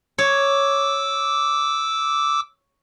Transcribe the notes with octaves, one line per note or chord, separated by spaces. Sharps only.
C#5 D6 E6